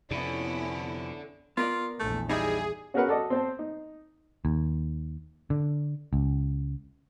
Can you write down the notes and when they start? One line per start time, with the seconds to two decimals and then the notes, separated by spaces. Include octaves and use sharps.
0.11 F2 C3 B3 C#4 E4 A4 D5
1.57 B3 F4 A#4 D5
1.99 A#1 E2 A3
2.29 G3 D#4 E4 G#4
2.94 C#4 F#4 G#4 A#4 B4 F#5
3.07 F#4 A4 D5 D#5
3.30 C4 C5 A5
3.59 D#4
4.45 D#2
5.50 D3
6.13 C#2